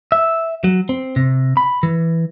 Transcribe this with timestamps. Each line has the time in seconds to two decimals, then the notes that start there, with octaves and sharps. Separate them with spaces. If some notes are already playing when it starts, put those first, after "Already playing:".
0.12 E5
0.64 F#3
0.89 C4
1.16 C3
1.57 B5
1.83 E3